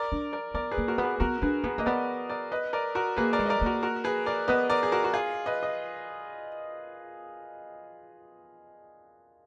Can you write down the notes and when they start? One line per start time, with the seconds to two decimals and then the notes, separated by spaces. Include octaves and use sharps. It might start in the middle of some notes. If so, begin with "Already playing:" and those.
Already playing: A#4 D5
0.12 D4
0.33 A#4 D5
0.54 B3 A#4 D5
0.71 G#4 B4
0.77 A#3
0.88 F#4 A#4
0.98 B3
1.03 G#4 B4
1.20 B3 F#4 A#4
1.42 D4 G#4 B4
1.64 B3 G#4 B4
1.78 A#3 D#5
1.86 B3 A#4 D5
2.29 A#4 D5
2.52 B4 D#5
2.73 A#4 D5
2.95 F#4 A#4
3.17 A#3 G#4 B4
3.33 A#4 D5
3.39 G#3
3.46 D#5
3.50 A#4 D5
3.61 A#3 F#4 A#4
3.83 F#4 A#4
4.04 G#4 B4
4.26 A#4 D5
4.48 B3 B4 D#5
4.69 A#4 D5
4.83 G#4
4.92 F#4 A#4
5.04 F#4
5.14 F4 G#4
5.46 B4 D#5
5.63 D#5